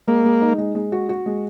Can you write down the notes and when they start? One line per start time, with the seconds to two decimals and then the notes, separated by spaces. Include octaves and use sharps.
0.07 G#3 A#3
0.25 G#3
0.42 D#4
0.58 G#3
0.75 G#3
0.92 F#4
1.09 F#4
1.26 G#3